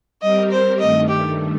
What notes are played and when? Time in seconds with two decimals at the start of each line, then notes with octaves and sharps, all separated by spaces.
0.22 G3 C4 G4 A#4 D#5
0.51 C5
0.80 G2 D#3 A3 D#5
1.09 G4